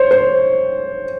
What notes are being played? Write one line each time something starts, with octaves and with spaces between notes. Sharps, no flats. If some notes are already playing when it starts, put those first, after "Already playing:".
Already playing: C5 C#5
C5